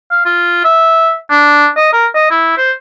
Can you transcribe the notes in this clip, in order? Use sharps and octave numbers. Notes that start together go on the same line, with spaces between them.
F5
F4
E5
D4
D#5
A#4
D#5
E4
C5